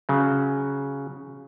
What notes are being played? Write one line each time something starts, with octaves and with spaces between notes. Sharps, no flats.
C#3 F#3